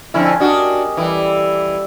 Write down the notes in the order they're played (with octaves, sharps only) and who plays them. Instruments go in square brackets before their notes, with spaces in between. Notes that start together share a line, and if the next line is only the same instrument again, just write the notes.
[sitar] F2 D3 E4 [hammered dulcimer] C#4
[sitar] D4 F#4 [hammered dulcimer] G4 A#4 D#5
[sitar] E3 [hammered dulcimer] G3 A4 D6